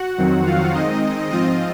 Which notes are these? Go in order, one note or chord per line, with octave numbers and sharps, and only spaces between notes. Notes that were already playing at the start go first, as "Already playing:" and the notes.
Already playing: F#4 F#5
F2 D#3 F#3 C4
F4 F5
D#3 G#3 C4 D#4 D#5
G#2 F3 C4 F4 D#5